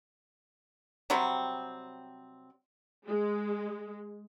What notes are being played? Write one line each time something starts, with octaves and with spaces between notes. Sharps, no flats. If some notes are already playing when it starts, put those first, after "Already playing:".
C3 F#3 G3 C4
G#3